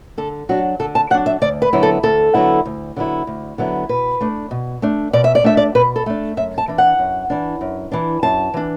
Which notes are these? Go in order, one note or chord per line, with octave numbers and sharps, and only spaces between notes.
D3 A4
F#3 D4 F#4
D3 A4
A5
F#3 D4 F#5
E5
D2 D5
B4
D3 F#3 B3 E4
A4
D2 A4
D3 F#3 B3 E4
D2
D3 F#3 B3 E4
D2
D3 F#3 B3 E4
B2 B4
A3 D4
B2
A3 D4
B2 D5
E5
D5
A3 D4 E5
D5
B2 B4
A4
A3 D4
F#2 E5
A5
E3 D4
F#5
F#2
E3 D4
F#2
E3 D4
F#2 A5
E3 D4